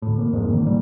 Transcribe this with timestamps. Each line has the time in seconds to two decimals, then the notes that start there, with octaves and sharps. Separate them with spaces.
0.02 D2 A2
0.17 C2 A#3
0.32 F2 G#2 E3 A#3
0.52 A#1 D3 D#3 A#3
0.65 A1 D2 G3